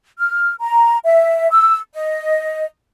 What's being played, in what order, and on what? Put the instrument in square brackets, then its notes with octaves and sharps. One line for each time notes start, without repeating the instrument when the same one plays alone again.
[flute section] F6
A#5
E5
E6
D#5